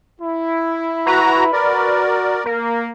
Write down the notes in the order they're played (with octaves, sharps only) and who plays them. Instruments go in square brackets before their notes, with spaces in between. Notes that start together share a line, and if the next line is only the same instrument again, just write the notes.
[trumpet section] E4
[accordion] F#4 A#5 [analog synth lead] B4
[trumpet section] F#4 [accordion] A#4 D5
[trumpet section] A#3 [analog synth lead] A#4